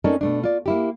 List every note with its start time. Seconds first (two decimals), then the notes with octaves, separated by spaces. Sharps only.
0.04 C4 C#4 D#4 A4 A#4 D5
0.21 B2 A3 D4
0.44 F4 D5
0.66 A#3 E4 G4